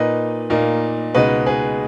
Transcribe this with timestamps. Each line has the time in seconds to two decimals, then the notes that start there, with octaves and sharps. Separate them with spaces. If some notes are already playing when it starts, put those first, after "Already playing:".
Already playing: A#2 A#3 D#4 B4 D#5
0.50 A#2 A#3 D#4
1.15 C#2 B2 G#3 D#4 B4 D#5
1.46 G#4 B4